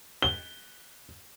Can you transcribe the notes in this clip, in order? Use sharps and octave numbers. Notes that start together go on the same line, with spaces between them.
G7